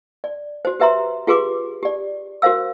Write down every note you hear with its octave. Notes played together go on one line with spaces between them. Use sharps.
D5
F#4 C5
G4 B4 E5 A#5 C6
F4 G4 G#4 B4 C6 D6
G4 D5
F#4 A#4 C5 F5 E6